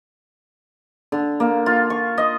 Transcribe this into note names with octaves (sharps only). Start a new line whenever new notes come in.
D3
A#3
F4
C#6
D#5